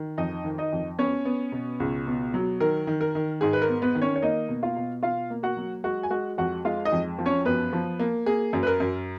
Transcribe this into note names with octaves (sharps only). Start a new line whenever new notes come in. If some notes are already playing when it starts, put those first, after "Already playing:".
Already playing: D#3
F2 D#4 D#5
D#3
D#4 D#5
F2
B3 C#4 C#5
B3
B2
C#2
B2
F#3
D#3 A#4
D#3
A#4
D#3
G#2 G#4
B4
A#4
B3
B3 B4
D#3
C#4 C#5
C#5
A#3 D#4 D#5
B2
F4 F5
B2
B2 F4 F5
A#3
F#4 F#5
F#3
G#3 F#4 F#5
G#5
G#3 F#4 F#5
F2 F#4 F#5
G#3 F4 F5
D#4 D#5
F2
F3
C#4 C#5
F#2 B3 B4
F3
A#3
A#3 G#4
F#2
B4
A#4
F#2